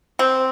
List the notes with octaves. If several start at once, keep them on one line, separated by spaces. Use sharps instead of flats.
C4